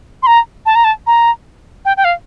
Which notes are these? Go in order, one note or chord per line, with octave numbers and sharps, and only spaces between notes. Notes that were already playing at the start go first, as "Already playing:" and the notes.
C6
A#5
A5
A#5
A5
A#5
G5
G5
F5